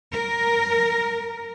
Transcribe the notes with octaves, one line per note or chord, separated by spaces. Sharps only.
A#4